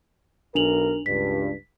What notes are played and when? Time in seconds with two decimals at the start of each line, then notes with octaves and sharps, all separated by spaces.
0.55 B1 D4 A#4 F7 F#7
1.06 C#2 G2 B6